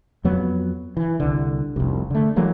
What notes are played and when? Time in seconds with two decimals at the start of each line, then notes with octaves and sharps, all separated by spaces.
0.24 F2 F#3 B3
0.97 E3
1.20 C2 D3
1.76 F1 C2
2.10 D3 A3
2.36 E3 F#3 G#3 A#3